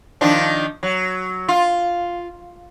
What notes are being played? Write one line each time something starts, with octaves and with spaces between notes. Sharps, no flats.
D#3 F3 D4
F#3
F4